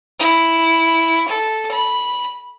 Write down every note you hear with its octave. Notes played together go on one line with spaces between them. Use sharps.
E4
A4
B5